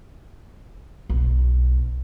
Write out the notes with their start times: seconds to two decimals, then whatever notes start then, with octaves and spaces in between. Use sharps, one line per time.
1.10 B1